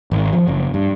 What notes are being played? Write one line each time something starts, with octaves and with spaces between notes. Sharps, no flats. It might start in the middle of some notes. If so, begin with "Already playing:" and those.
G#1
F3
F#1
G2